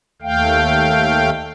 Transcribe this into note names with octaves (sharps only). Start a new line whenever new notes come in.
D#2 A3 F5 G5